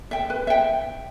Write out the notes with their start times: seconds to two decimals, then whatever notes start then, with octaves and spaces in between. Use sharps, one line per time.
0.11 E5 G5
0.30 B4
0.47 E5 G5